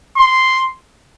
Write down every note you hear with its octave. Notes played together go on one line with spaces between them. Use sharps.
C6